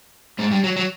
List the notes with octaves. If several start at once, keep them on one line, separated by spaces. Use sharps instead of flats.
G#2 G#3
G2 G3
F#3
F#3